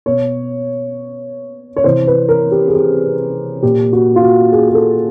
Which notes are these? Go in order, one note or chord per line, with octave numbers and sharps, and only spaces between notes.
B2 C#5
C#5
C3 E3 C5
B4
A#4
G4
G#4
G4
A#2 G4
F#4
F4
F#4
G#4
G#4
A4